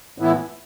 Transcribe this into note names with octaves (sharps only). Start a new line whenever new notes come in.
A2 E3 B3 E4